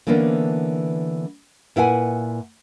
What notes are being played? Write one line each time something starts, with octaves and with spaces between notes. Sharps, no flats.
D3 E3 A#3 B3 C#4 D4
A#2 E4 B4 F#5 G#5